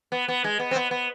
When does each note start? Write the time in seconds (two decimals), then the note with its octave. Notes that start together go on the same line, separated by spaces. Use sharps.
0.12 B3
0.28 B3
0.44 G#3
0.59 B3
0.71 C4
0.76 B3
0.91 B3